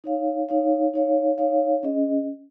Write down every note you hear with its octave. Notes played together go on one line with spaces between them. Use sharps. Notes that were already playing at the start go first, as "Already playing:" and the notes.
D#4 C#5 F5
D#4 C#5 F5
D#4 C#5 F5
D#4 C#5 F5
C#4 G#4 D#5